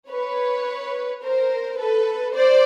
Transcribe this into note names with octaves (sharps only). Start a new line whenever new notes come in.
B4 C#5
A#4 C5
A4 B4
C5 D5